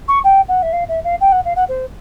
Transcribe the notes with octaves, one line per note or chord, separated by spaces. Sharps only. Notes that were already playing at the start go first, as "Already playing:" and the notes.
C#6
G5
F#5
E5
F5
E5
F5
G5
F#5
F5
F#5
C5